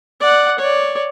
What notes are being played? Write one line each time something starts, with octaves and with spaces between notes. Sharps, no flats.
D5 F#5
C#5 D5